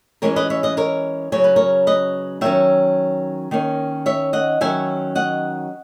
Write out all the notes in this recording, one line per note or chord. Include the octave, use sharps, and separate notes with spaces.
E3 G#3 C#4 A#4 C#5
B4 D#5
C#5 E5
B4 D#5
A#4 C#5
C#3 F#3 C#4 C#5
B4
A#4 C#5
B4 D#5
D#3 F#3 C#4 C#5 E5
D#3 A#3 C#4
C#5 E5
D#5 F#5
D#3 F#3 C#4 E5 G#5
D#5 F#5